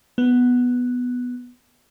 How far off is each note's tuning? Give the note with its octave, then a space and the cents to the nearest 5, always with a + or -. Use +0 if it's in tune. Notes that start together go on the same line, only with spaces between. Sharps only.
B3 +0